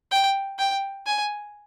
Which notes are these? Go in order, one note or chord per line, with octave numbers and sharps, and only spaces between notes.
G5
G5
G#5